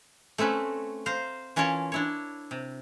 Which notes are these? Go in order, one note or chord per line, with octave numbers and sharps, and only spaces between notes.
A3 C4 C#4 B4
C5 F5 A#5
E3 C#4 F4 A#4 C#5 A5
D4 E4 C#5
C3